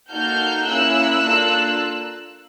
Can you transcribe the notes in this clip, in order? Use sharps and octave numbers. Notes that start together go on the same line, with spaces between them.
A#3 D#4 F#4 A4 F6 G6
A#3 C#4 E4 G#4 E6 F#6
A#3 D4 F4 A4